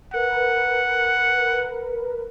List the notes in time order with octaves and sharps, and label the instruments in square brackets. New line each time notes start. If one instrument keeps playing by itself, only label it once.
[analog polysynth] A#4 B4 [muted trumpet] F#5